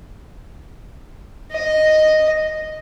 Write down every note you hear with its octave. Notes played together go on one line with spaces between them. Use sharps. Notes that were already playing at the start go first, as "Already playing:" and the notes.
D#5